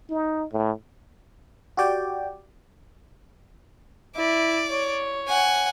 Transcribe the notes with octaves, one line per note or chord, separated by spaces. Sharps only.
D#4
A2
F#4 G4 D5 G5
E4 D5
C#5
F#5 G#5